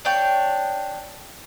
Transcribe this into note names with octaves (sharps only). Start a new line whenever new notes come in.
D4 C#5 G5